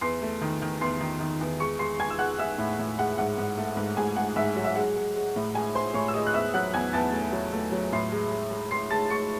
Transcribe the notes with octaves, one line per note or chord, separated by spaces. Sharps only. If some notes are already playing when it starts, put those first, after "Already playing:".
E2 C6 C7
A3
D#3
D#3
E2 C6 C7
D#3
D#3
E2
G#3 C#6 C#7
G#3 C6 C7
G#3 G#5 G#6
E6
G#3 F#5 F#6
G#3 E5 E6
A2
A2
G#3 F#5
G#2 F#5
G#2
A3
G#2
G#2 G#4 G#5
G#2 F#5
G#2 E5
F#3
E5
G#3 F#5
G#3
G#3
A2
G#3 G#4 G#5
G#3 C5 C6
A2 C#5 C#6
E6
G#3 D#5 D#6
F#6
E2 E5 E6
F#3 F#5 F#6
E2 G#5 G#6
E2 A5 A6
A3
F#3
A3
F#3
A2 C6 C7
G#3
G#3
G#3
G#3 C6 C7
G#3 A5 A6
G#3 C#6 C#7